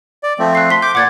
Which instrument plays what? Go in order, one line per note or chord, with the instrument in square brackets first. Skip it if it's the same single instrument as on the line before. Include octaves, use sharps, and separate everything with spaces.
[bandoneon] D5
F3 A3 C4
[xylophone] F#6 C7
C6 B6
[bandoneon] D6 [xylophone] G6
[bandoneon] A#2 F#5 [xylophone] D6 G#6 A6